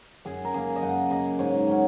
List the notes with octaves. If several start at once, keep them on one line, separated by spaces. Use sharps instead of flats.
F#2 G#4
A#4
C#3 A#3 G#4
D#5
F#2 F#5
C#3 A#3 D#5
G#2 C#5
F#3 C#4